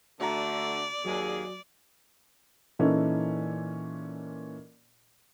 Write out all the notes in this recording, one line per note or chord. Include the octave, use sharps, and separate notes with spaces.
D3 A3 F#4 D5 A#5
D#2 F#3 G#4
A#2 E3 C#4 D#4 A4